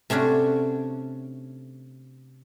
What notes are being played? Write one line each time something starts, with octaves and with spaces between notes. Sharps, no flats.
C3 A3 C#4 D4 F#4